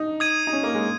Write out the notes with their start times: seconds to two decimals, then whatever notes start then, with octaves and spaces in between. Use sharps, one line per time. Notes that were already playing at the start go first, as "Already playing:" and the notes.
Already playing: D#4
0.20 D#6 G#6 D#7
0.47 D#4
0.53 C#4
0.63 A#3
0.75 G#3